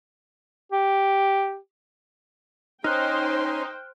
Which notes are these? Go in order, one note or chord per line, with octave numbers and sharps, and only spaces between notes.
G4
C#4 D#4 C5 G5 C6 F6 F#6